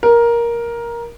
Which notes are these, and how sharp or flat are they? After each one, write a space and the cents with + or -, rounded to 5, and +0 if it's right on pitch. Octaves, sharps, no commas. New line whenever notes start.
A#4 +10